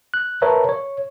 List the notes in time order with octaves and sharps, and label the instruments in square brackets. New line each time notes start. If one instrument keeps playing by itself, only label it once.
[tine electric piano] F#6
A#4 B4 C#5 E5 A5 A#5
C#5